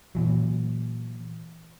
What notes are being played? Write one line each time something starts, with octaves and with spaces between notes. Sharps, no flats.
A#2 E3 F#3